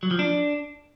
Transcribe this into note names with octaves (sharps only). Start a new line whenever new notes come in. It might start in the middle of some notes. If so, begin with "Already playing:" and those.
F#3
F3
D4